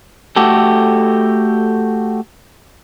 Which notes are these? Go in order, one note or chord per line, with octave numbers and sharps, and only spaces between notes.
A3 F#4 G4 A4